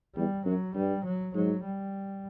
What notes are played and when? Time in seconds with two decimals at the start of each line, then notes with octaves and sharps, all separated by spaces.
0.16 E2 G3
0.45 F#2 F#3
0.75 G2 G3
1.05 F#3
1.34 G#2 F#3
1.64 G3